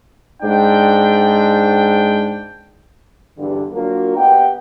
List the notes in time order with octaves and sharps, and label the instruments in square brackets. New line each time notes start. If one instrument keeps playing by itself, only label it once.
[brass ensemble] G#2 D4 G5
E2 G2 D3
F#3 A#3 D4 F4 F#4 A#4
B3 G4 D#5 F#5 G5